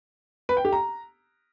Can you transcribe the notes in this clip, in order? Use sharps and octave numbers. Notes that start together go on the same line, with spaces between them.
B4
G5
G4
A#5